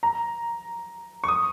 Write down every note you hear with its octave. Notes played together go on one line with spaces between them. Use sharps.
A#5
C#6
D#6